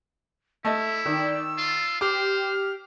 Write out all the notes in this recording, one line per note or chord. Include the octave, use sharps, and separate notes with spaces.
A3 E4 D#5 E6
D#3 D5 G5
F4 A6
G4 C5 D6 F6